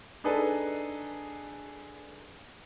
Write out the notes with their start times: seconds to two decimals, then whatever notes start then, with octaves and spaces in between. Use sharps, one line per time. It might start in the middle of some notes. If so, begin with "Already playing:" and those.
0.24 D4 D#4 G#4 A4 B4